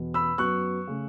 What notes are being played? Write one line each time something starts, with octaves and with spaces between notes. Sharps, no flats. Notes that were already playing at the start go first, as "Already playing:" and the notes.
Already playing: E2 B2 B3
B5 E6
F#2 F#3 B3 C#6 F#6
C#3 A3